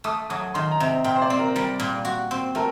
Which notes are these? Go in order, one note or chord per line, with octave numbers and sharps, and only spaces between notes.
A3 D#6
F#3 D#6
D#3 C6
A#5
C3
A#2 G5
C5
D5
C4
A#4
G3 A#4
A#2
F#4
C4
A3 A#4